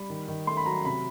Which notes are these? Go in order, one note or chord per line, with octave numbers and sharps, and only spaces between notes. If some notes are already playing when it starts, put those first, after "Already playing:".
Already playing: G3 B5
D#3
D#3
A3 C6
B5
F#3 A#5
C3 B5